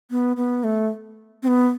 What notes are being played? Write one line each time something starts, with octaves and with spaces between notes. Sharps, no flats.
B3
B3
A3
C4
B3